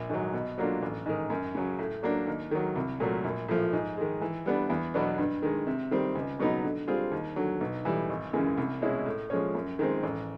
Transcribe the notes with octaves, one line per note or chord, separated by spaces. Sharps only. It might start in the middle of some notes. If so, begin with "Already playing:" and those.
Already playing: A#1
G#2 D#3 F#3
B2
F#3 A#3 D4 F4
A1
G#2 D#3
F#2
C#3 F#3
A2
F#3 A#3 D4
D#2
D#3 F#3
C2
A#2 F#3 A3
A#1
A2 F3
G#2
D#3 G#3
E3
G3 B3 D4
E2
B2 F#3 B3 D4
G2
D#3 G#3
C3
D#3 G3 C4
C#2
B2 F#3 B3 D#4
D3
G3 C4 F4 G#4
D#2
D3 F#3
B1
A2 E3 G3
G#1
F#2 C#3 E3 G#3
C2
B2 G#3 C#4 E4
A2
F3 G#3 C#4
F#2
D#3 G#3 C4
A1